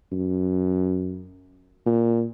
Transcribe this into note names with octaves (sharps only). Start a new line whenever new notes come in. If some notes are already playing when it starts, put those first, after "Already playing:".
F#2
A#2